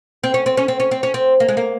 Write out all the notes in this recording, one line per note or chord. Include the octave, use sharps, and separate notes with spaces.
C4
C#4
C4
C#4
C4
C#4
C4
C#4
C4
A#3
G#3
A#3